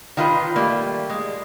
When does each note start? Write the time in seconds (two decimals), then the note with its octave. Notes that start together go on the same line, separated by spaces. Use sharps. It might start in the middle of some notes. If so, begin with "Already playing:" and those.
0.17 D#3 F4 B4
0.56 G3 A3 A#3
1.10 G#3